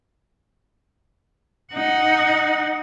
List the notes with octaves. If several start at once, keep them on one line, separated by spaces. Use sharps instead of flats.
D#4 F#5